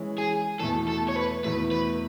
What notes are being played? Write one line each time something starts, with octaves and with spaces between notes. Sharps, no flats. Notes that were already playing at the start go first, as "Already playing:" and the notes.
Already playing: E3 G#3 C#4
G#4
E2 B2 A3 A4
A4
C#5
B4
E2 B2 A3 B4
B4